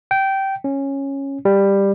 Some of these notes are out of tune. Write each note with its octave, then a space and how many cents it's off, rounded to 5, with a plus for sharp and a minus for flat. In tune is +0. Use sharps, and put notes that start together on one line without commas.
G5 -15
C#4 -10
G3 +10